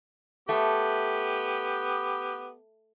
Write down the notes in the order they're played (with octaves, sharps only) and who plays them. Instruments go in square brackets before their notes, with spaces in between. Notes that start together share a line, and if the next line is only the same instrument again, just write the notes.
[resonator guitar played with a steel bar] A3 [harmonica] B3 G4